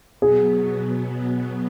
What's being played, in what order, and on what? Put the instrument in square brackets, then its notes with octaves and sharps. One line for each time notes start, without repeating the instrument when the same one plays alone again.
[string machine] B2 F#3 B3 [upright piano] G#4